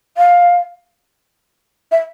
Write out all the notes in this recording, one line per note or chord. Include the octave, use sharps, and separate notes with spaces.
F5
E5